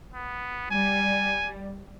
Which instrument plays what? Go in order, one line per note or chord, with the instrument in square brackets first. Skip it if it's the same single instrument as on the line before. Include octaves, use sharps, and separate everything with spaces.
[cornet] B3
[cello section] G3 [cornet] G#5